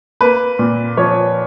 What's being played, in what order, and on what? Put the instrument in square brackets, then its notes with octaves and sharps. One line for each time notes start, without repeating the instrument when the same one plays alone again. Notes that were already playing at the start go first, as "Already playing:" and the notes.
[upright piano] A#3 B4
A#2
F3 C#5